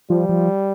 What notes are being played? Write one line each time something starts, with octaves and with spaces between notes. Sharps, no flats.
F3 G3
F3